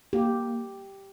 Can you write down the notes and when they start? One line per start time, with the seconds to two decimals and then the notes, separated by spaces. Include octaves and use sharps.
0.13 A#3 G4
0.33 A#3